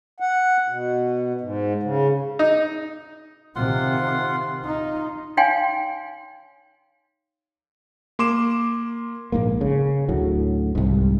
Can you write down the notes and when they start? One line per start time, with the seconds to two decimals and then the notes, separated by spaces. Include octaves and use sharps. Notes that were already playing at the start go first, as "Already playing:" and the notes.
0.20 F#5
0.68 B2
1.41 G#2
1.83 C#3
2.39 D#4
3.56 C3 D#3 F4 F#5 C6
4.64 D#4 F4
5.37 D#4 C#5 F5 G5 G#5 C6
8.19 A#3 C6 D6 E7
9.32 A#1 G#2 A#3
9.61 C#3
10.09 D2 A2 F#3
10.75 C2 G#2